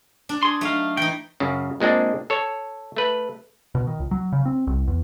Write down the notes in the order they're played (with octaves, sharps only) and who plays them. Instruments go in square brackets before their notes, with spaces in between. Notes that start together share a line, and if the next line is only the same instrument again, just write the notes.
[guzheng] D4
[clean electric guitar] G#4 C6
[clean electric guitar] F#3 F5 [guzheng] A3 D#4
[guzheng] E3 D#4 [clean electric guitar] G5
[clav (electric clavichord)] F#2 C#3
A#2 G#3 C4 D4 G#4
A4 C#5
A3 B4
[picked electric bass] B2
D#3
C#2
F#3
C#3
C4
C2
E2